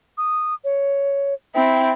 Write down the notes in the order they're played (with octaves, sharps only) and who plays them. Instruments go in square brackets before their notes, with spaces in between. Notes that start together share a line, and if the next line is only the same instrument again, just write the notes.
[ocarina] D#6
C#5
[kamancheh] C4 E4 [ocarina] G5